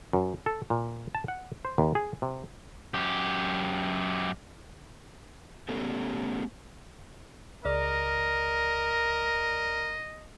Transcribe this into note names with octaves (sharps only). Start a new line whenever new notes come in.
F#2
A4
A#2
A5
F#5
C5
D#2
G#4
C3
F#2 G4
A3 B3 C#4 G4 A4
C#2 A#4 D5 D#5 F6